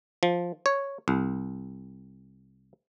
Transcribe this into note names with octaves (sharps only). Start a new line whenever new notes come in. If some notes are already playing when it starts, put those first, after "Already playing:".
F3
C#5
C2